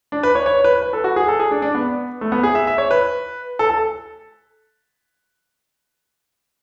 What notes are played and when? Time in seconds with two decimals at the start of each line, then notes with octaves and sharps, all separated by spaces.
0.12 D4
0.23 B4
0.35 C#5
0.46 C#5
0.64 B4
0.82 B4
0.93 A4
1.04 F#4
1.16 G#4
1.28 A4
1.39 G#4
1.51 D4
1.62 D4
1.75 B3
2.21 A3
2.32 B3
2.43 G#4
2.55 E5
2.67 E5
2.78 C#5
2.91 B4
3.59 A4
3.70 A4